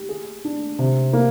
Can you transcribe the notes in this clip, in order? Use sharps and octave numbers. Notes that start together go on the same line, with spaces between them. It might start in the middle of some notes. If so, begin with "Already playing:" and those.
Already playing: G4
G#4
D4
C3
A#3